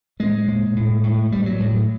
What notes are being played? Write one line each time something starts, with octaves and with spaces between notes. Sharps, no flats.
A2 G#3
A#2
A2
A2
A#2 G3
F#3
A2